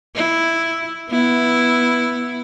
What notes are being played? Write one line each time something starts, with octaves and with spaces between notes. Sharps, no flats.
E4
B3 E4